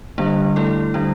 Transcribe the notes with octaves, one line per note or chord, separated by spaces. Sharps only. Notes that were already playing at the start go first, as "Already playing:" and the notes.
D3 G3 A#3 D4
A3 E4 A4
D3 G3 D4